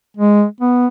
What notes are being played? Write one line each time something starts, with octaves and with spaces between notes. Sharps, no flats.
G#3
B3